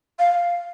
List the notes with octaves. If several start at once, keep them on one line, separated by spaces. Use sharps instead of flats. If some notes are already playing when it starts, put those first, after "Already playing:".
F5